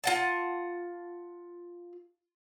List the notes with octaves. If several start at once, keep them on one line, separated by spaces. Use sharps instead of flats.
F4 F#5 A5